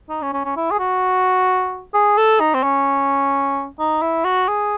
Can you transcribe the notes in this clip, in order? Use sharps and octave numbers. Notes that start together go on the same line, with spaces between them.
D#4
C#4
C#4
C#4
E4
G#4
F#4
G#4
A4
D#4
C4
C#4
D#4
E4
F#4
G#4